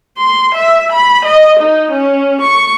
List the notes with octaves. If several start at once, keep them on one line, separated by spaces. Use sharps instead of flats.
C6
E5
B5
D#5
D#4
C#4
C#6